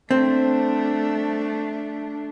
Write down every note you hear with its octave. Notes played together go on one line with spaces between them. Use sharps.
A3 C4 D4